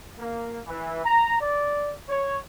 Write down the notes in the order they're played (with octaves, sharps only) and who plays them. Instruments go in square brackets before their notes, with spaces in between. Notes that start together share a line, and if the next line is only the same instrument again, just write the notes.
[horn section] A#3
E3
A#5
D5
C#5